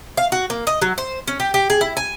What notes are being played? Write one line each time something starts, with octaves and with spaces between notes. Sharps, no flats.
F5
F#4
A#3
D#5
F#3
C5
C#4
G4
G4
G#4
E4
G#5